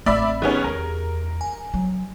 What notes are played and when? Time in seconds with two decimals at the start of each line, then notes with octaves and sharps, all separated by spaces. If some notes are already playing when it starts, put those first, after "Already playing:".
0.06 A1 A3 C4 D5 E5 B5 B6
0.42 D#3 B3 C#4 G4 G#4
0.64 E2 A#4
1.41 G#5
1.74 F#3